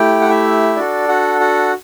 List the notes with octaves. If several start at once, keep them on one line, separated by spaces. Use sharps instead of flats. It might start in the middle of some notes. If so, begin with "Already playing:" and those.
Already playing: A3 E4 G4 G5
F#5
E4 E5
D4 F#4 A4 D5
F#4 F#5
F#4 F#5